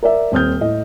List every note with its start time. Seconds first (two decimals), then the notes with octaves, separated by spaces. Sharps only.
0.03 A#4 D5 E5
0.32 D#1 C4 D#6 F6 G6
0.61 A2 D#5